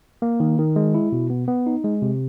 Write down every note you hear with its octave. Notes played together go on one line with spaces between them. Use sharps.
A#3
D#3
D#3
G#3
E4
B2
B3
B3
D#4
G#3
C3